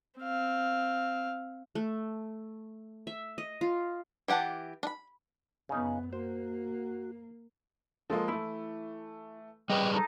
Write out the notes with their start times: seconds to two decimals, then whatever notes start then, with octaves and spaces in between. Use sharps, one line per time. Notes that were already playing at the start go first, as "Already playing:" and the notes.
0.19 C4 F5
1.75 A3
3.07 E5
3.38 D#5
3.61 F4
4.28 E3 G4 F#5 A5
4.83 D4 B5
5.69 F#2 C#3 B3 D#4
6.13 A#3 F#4 C5
8.10 F3 G#3 A#3 A4
8.28 E3 A3 E4
9.70 G3 G#4 B4 D#5 G5
9.93 D#4 A4 A5